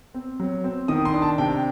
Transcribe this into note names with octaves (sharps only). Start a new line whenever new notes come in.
C4
F#3
C4
D#3 D#6
C6
D4
A5
C3 G5